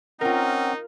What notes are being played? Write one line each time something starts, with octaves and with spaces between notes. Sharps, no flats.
C4 C#4 D#4 F4 A#4 F#5